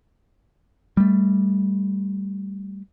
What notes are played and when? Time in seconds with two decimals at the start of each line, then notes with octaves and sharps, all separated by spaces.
0.97 G3 A3